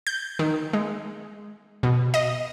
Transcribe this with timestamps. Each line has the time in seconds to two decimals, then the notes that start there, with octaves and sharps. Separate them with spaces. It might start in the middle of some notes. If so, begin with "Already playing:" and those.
0.07 G6
0.39 D#3
0.73 G#3
1.83 B2
2.14 D#5